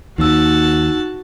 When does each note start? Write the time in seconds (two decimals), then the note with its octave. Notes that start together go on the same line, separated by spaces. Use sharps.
0.18 D#2 A#3 D#4 F#4 A5 E6